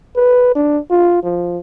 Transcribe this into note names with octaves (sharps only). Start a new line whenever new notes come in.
B4
D4
F4
F3